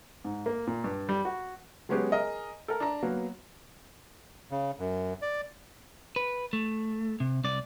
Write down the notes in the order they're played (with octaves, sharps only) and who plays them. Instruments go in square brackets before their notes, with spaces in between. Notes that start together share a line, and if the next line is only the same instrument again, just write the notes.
[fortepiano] G#2
A#3
A#2
G2
G3
F#4
[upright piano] F#3 G#3 B3 C#4 G4 G#4
G#4 A#4 D#5
A4 A#4
D4 A#5
F#3 A#3 B3
[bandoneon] C#3
F#2
D5
[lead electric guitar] B4
A3
C3
C2 D5